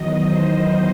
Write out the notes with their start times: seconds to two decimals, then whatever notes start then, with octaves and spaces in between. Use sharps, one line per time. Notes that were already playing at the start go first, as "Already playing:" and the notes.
Already playing: E2 D#3 F#3 D#5
0.24 C5